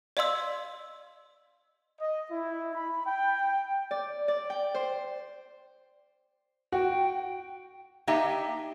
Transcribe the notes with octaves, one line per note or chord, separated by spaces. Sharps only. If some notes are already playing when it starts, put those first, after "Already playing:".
D5 D#5 F5 C6 E6
D#5
E4
B5
G5
D5
D5
G5
C5
F#4 G5
A#3 D4 D#4 G4 D#5 E5